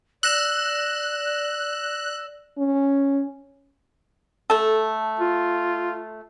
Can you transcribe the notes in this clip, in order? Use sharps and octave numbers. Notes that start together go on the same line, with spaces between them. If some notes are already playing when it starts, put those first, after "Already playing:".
D5 E6 F#6 A#6 E7
C#4
A3 A4
F4